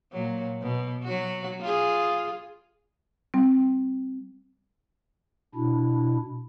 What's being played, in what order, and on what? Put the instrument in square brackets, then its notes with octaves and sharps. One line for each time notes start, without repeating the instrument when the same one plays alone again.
[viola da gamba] A#2 F#3
B2
F#3 F#4
F4 G#4
[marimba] G3 C4
[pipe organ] B2 D4 E4